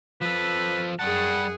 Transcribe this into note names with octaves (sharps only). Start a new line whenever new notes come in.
F3 A4 B4
F#2 G3 G#4 F#5 A5